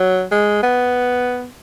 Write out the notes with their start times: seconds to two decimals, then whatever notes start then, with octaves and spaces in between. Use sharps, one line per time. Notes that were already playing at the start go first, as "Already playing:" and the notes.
Already playing: F#3
0.32 G#3
0.63 B3